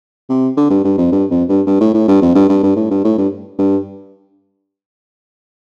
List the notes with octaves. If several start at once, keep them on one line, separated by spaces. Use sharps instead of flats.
C3
D3
G2
G2
F2
G2
F2
G2
G2
A2
A2
G2
F2
G2
G2
G2
A2
G2
A2
G2
G2